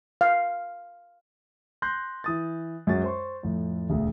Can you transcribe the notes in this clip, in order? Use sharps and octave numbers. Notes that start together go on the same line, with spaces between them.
F5
C6 F#6 G6 A#6
E3 D#6 A6
F#2 G#3 F#4 A6
C5 C6 C#6
F2 A2
E1 D2